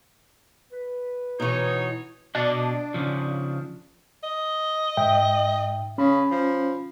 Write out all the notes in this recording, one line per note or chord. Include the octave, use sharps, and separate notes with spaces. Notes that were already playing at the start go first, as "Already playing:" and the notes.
B4
B2 E3 D#4 C#5
B2 D4 F#4 D#5
C#3 F3
D#5
G#2 E5 G5
C#3 C#4 B5
F3